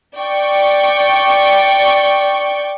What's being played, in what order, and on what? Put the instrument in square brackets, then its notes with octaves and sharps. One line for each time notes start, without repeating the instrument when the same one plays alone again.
[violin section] D5 G5 C#6